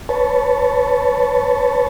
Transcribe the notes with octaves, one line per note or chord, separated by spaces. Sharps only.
B4 C#5 A5